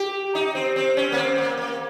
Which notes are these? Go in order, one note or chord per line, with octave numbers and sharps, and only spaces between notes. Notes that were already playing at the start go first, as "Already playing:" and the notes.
Already playing: G4
D#4
C4
C4
C#4
A#3
C4
A#3
A#3